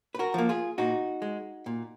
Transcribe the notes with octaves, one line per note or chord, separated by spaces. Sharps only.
B4
F#4 A#4
F3 A#3
F4 G#4
A#2 D#4 F#4
G#3
A#2